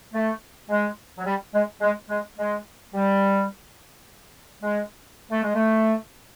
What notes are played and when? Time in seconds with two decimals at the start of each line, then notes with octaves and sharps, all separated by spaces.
0.14 A3
0.69 G#3
1.17 F#3
1.25 G3
1.53 G#3
1.81 G#3
2.09 G#3
2.37 G#3
2.94 G3
4.62 G#3
5.30 A3
5.43 G#3
5.54 A3